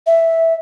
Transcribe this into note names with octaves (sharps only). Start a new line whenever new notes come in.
E5